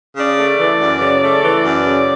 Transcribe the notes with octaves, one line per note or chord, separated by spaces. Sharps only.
C#3 D5
A3
E3
F#2
C#3
A3
E3
F#2
C#3